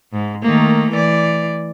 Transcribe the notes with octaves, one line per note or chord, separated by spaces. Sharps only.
G#2
D#3 A3 A#3
E3 D5